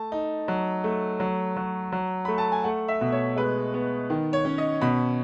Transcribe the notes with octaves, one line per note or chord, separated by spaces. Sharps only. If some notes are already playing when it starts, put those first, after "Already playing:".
Already playing: A3 A5
D#4
F#3
A3
F#3
F#3
F#3
A3 B5
A5
G#5
A3 F#5
E5
B2
C#5
G#3 B4
B3
D#3
C#5
C#4
D#5
B2 B5